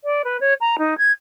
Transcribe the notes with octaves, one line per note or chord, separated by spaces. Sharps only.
D5
B4
C#5
A#5
D#4
G#6